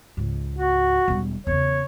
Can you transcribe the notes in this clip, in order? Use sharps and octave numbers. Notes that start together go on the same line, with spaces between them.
C#2 G#2
F#4
E1 G3
E2 C#3 C#5